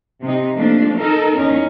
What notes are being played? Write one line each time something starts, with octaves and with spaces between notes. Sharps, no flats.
C3 D#4
F3 A3 A#3 D4
D#4 A4 A#4
E2 C#4 D#4